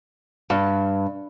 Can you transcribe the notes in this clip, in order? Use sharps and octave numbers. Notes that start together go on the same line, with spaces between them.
G2